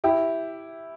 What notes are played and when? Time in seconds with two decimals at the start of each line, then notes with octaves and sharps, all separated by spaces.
0.04 E4 G4